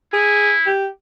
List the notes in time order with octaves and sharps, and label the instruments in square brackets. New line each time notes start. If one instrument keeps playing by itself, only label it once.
[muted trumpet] E4 [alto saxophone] G#4
[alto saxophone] G4